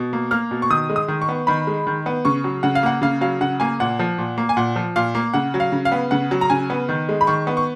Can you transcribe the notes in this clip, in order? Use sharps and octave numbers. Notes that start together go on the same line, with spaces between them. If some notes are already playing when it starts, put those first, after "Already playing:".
Already playing: B2
A#3
A#3 F6
B2
C#6
D#3 D#6
G#3
D#6
D#3
C#6
B3
D#3 B5
G#3
D#3
B3
C#3 C#6
F#3
C#3 F#5
F5
A#3 F#5
C#3 F5
F#3 F5
C#3 F#5
A#3 G#5
A#2 F#5
F3
A#2
A#3
G#5
A#2 F#5
F3
A#2 F5
A#3
C#3 F#5
F#3
F5
C#3
F5
B3
C#3 F#5
F#3
A#5
C#3 G#5
B3
D#3
G#3
B5
D#3 C#6
B3
C#6